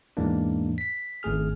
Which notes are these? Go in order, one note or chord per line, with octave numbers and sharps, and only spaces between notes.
E2 G#2 E3 G#3 A#3 D4
B6
G#1 A3 G#4 F6